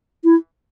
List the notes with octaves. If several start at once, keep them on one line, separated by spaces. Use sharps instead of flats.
E4